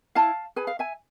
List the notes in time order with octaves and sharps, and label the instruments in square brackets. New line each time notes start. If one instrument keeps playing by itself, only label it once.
[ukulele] E4 F5 A5
G#4 B4 G#5
F5
E5 G#5